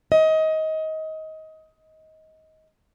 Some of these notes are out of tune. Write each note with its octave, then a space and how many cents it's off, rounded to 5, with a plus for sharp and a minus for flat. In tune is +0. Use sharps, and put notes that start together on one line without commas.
D#5 +20